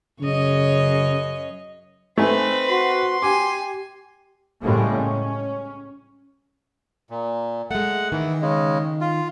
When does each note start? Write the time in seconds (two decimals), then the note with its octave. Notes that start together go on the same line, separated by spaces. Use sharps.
0.21 F#2 C#3 C#5 D#5
2.18 A3 C4 D#4 B4 G#5
2.69 F#4 C6
3.22 G4 G#5 D6
4.63 A2 C#3 G3 G#3 A#3
4.97 C#4
7.10 A#2
7.71 G#3 A3 F#5
8.12 D#3 E3
8.42 C#3 G#3
9.01 F4